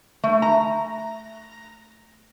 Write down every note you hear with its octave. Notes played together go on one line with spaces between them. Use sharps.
A3
A#5